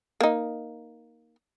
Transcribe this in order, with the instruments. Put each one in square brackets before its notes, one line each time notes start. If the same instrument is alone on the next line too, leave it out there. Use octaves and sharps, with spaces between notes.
[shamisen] A#3 D#4